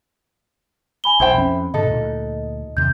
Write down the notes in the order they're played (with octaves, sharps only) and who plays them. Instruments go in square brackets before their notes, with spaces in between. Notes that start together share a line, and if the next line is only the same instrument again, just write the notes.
[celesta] G#5 B5 G7
[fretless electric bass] B1 [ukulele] E4 C5 G5
[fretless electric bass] F2 C#4 [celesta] B5
[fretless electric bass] G#2 B2 D3 [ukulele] D#4 A4 [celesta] D#5
[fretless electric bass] D2 A#2
[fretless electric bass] E2 C3 D#3 [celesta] G6